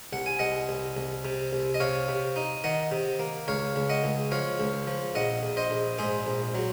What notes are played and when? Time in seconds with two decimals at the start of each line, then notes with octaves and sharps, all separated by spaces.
0.13 C2 F#5
0.26 G#5
0.39 C2 D#5 F#5
0.69 C2
0.97 C2
1.25 C3
1.53 C2
1.74 D#5
1.80 C3 C#5 F5
2.08 C3
2.36 D#4
2.64 D#3 D#5 F#5
2.92 C3
3.19 A#3
3.48 C#2 C#5 F5
3.76 C#2
3.90 D#5 F#5
4.04 C#2
4.32 F3 C#5 F5
4.60 C#2
4.87 F3
5.15 A#1 D#5 F#5
5.43 A#1
5.57 C5 D#5
5.71 A#1
5.98 G#2 G#4 C5
6.27 A#1
6.55 F#3